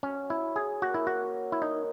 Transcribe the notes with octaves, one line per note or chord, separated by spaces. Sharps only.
F#3 C#4
E4
C#4
G#4
A#3 F#4
E4
F#4
C#4
E4
D#3 D#4